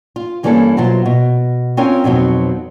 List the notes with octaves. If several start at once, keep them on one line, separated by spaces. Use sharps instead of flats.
F4
G2 E3 G3 A#3 C#4 A4
B2 F#3 E4 F4 C5
B2
C4 C#4 F4 A#4 C#5 G5
F2 B2 F#3 C4 D#4